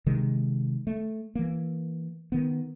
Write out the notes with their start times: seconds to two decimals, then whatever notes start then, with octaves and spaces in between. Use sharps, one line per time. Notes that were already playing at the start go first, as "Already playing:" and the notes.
0.06 C3 D#3 G#3
0.87 A3
1.35 E3 A#3
2.32 D#3 B3